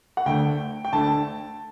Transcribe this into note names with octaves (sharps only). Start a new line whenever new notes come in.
F#5
D2 D3 A3 G5
G5
D2 D3 A3 A5